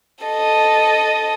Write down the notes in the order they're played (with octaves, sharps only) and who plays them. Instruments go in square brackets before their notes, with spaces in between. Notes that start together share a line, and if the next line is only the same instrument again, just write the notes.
[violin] A4 D#5